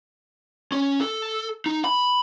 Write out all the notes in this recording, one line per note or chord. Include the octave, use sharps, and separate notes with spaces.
C#4
A4
D#4
B5